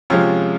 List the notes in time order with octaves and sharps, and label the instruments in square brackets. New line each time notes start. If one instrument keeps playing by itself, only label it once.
[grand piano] C3 F3 G#3 C#4 F4